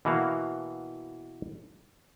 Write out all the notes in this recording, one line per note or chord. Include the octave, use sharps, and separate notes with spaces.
B2 E3 A#3 F#4 F5